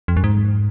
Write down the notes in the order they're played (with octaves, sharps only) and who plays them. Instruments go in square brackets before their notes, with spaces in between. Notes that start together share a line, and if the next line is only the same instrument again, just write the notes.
[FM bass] F2
F#2
G#2